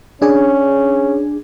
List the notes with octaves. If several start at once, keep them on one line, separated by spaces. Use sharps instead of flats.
C#4 D4 G#4